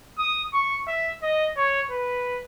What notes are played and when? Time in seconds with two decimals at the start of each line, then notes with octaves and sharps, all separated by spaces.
0.19 D#6
0.53 C#6
0.87 E5
1.22 D#5
1.57 C#5
1.91 B4